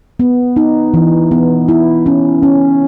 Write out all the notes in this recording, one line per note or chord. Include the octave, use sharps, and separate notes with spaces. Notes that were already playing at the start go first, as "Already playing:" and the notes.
B3
D#4
E3
B3
E4
C#4
C#4